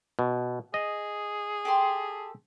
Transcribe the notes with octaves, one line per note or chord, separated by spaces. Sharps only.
B2
G#4 D#5
G4 A4 C6